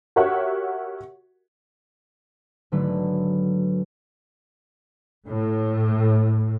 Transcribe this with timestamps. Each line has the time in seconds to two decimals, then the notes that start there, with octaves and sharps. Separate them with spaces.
0.16 F#4 G4 A#4 C#5 E5 F#5
2.72 G#1 D3 F#3 A3 B4
5.28 A2